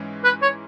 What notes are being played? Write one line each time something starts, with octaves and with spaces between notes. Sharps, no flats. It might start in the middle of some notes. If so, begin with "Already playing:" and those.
Already playing: G#2 E3 G#3 C#4
B4
C#5